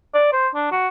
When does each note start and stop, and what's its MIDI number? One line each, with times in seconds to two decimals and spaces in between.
0.14 0.29 74
0.33 0.48 72
0.55 0.67 62
0.72 0.88 66